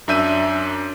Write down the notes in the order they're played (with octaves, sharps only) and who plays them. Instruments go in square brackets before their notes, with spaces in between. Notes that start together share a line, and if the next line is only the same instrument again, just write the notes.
[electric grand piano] F#2 D4 E5 G6 D#7